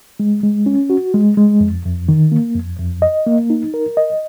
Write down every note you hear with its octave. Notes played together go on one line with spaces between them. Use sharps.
G#3
G#3
C#4
F#4
G#3
G#3
F2
F2
D#3
A#3
F2
F2
D#5
A#3
D#4
A#4
D#5